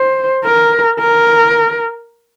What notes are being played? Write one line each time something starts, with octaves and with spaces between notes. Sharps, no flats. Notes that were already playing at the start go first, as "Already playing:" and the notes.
Already playing: C5
A#4
A#4